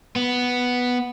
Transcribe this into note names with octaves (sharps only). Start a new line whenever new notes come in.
B3